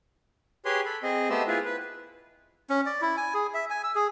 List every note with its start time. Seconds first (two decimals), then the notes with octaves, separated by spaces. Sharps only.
0.65 G4 G#4 B4 C#5 C6
0.86 A4 B5
1.03 C4 G#4 D#5
1.30 A3 B3 G4 C5 D#5 E6
1.48 E4 F4 G#4 B4
1.65 B4
2.70 C#4
2.86 D5
3.01 E4
3.17 G#5
3.34 G#4
3.54 E5
3.70 G#5
3.84 E6
3.95 G#4